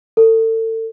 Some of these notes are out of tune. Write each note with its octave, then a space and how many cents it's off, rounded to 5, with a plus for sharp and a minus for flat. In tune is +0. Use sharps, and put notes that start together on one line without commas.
A4 +35